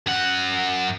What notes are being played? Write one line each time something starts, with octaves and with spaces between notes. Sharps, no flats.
F#2 F#5